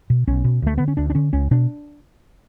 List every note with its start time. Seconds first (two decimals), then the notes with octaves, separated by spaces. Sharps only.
0.10 B2
0.27 B1 C#4
0.44 B2
0.62 D2 A3
0.78 D3 B3
0.88 C#4
0.97 D2 D4
1.10 D4
1.15 D3 C#4
1.33 C#2 C#4
1.51 B2 D4